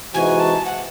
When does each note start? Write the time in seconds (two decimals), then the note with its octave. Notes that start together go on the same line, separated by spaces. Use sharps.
0.14 C3 E3 G#3 D#4 F#4 G#5
0.40 A5
0.65 F#5